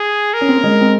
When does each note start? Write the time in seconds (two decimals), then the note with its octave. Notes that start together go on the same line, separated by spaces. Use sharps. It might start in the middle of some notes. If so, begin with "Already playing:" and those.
Already playing: G#4
0.34 A#4
0.41 C#4
0.48 C4
0.56 A#3
0.64 G#3
0.81 C4